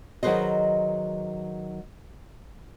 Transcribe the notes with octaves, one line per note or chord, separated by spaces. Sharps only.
D#3 F#3 G#4 B4 C5 D#5